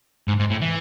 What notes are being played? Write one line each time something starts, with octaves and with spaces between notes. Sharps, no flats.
G#2
G#2
A2
E3